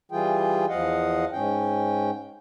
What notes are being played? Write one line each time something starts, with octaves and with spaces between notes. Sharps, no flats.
E3 G3 F4 G#4 G5
E2 F3 D#5 F5 F#5
G#2 C#4 G5